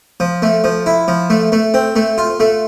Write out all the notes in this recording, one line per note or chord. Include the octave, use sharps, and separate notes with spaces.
F3
A3
F3
E4
F3
A3
A3
C4
A3
F4
A3